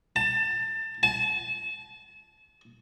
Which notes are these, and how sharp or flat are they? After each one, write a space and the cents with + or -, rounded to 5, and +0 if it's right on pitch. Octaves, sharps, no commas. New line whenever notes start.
A5 +25
A5 -35